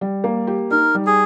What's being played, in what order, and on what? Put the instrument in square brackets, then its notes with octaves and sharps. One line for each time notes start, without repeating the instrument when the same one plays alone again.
[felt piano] G3
A#3
G4
[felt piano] D#4 [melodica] A#4
[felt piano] G3
[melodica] G#4